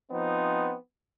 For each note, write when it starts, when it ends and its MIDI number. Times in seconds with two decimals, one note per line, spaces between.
0.11 0.74 53
0.11 0.74 59
0.11 0.74 60
0.11 0.74 63